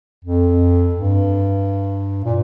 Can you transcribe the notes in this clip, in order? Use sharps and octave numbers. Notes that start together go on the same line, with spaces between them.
F2
G2
A#2